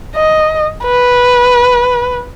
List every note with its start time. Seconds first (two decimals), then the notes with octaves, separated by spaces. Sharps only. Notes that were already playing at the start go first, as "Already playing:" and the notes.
0.16 D#5
0.86 B4